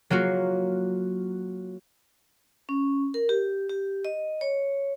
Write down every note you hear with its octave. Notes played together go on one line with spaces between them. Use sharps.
F#3 A#3 F4 F#4
C#4
A#4
G4
G4
D#5
C#5